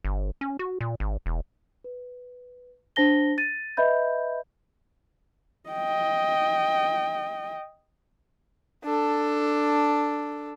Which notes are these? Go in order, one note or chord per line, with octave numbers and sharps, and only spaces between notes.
G1
C#4
F#4
A#2
G#1
E1
B4
D4 C5 A5 A#6 G7
A6 D#7
B4 D#5 E5 B5 G6
D#5 G5
D4 A4